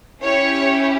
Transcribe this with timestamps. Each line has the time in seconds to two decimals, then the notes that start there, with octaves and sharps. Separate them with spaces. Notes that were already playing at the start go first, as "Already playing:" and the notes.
0.22 C#4 E4 G4 C#5